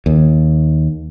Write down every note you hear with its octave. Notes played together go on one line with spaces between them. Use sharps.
D#2